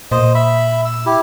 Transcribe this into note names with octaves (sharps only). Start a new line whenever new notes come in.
A#2 C5 D#5
E5 B5
E6
E4 G4